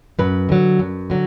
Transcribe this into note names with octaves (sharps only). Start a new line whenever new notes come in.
F#2 B4
D3 F#3
F#2
D3 F#3